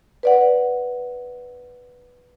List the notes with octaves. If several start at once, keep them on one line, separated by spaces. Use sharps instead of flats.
B4 D5 F#5